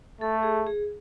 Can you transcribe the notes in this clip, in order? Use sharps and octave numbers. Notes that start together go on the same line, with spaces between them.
A3 A4
G#4
G#4